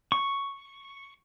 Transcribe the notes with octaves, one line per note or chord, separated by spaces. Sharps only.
C#6